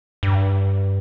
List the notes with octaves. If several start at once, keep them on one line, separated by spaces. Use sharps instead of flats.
G2